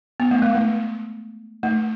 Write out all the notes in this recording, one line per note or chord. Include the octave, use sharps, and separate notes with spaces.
B3
A3
G#3
A3
A3